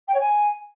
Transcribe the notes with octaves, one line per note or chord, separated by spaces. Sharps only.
G5
C#5
G#5